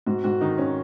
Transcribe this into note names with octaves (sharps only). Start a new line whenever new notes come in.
G#2 F#4
G#2 F#4
D#3 D#4
C#4